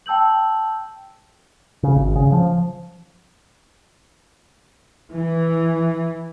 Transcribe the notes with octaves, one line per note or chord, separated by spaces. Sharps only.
G5 A5 E6 G6 F#7
C#3
G#1
C#3
F3
E3